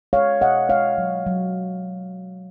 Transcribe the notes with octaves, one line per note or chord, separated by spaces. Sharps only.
G#3 C#5 F5
B2 D#5 F#5
G#3 C#5 F5
F#3
F#3